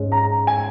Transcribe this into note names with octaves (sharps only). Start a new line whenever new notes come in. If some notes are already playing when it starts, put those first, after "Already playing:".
Already playing: G#2 G#3 C#4
A#5
G#5